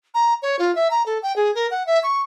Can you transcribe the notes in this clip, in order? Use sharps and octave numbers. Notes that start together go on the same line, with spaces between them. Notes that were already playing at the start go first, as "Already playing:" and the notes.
A#5
C#5
F4
E5
A#5
A4
G5
G#4
A#4
F#5
E5
C#6